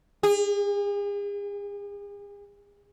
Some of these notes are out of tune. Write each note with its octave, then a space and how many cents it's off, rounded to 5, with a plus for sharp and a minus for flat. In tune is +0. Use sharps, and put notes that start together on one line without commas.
G#4 -40